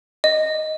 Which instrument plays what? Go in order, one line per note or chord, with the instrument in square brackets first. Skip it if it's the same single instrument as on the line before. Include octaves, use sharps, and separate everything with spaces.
[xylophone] D#5